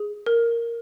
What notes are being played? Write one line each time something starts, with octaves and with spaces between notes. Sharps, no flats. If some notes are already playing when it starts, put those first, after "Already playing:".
Already playing: G#4
A#4